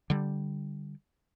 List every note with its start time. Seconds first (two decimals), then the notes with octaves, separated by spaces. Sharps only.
0.10 D3 G3